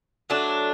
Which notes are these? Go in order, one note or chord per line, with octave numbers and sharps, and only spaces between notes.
F#3 A3 D4